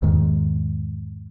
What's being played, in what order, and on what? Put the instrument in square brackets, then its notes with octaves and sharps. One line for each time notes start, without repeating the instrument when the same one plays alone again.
[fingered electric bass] E2 G#2 D#3 G#3